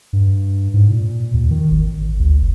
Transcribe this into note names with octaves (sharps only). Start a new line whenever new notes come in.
G2
G#2
A#2
D#2
D#3
G#1
D2
F#1